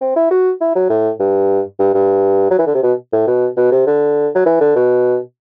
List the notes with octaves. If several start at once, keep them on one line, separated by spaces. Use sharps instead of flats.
C4
E4
F#4
E4
F#3
A2
G2
G2
G2
F#3
E3
D3
C3
B2
A2
B2
B2
C3
D3
F#3
E3
D3
B2